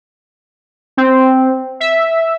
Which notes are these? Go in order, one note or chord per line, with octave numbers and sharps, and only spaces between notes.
C4
E5